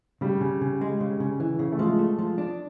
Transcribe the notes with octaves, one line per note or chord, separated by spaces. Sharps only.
C#3 G3
C#3
C#3
G#3
C#3
C#3
E3
C#3
A3
F3 G#3
A3
F3
D4